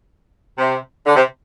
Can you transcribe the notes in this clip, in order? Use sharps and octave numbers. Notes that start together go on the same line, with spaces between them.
C3
D3
C3